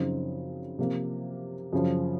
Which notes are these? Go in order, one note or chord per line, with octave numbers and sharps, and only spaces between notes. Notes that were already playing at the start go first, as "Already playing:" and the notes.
Already playing: F#2 C#3 F3 C4 D#4
C3 F3 A#3
F#2 C#3 F3